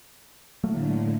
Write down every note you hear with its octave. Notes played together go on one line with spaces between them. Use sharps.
A2 D3 F#3 A3 A#3